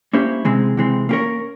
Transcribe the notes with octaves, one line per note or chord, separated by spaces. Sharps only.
A#3 C#4 E4 G4 C5
C3 E3 G#3 C4
C3 E3 G#3 C4
A#3 C#4 G4 A#4 C#5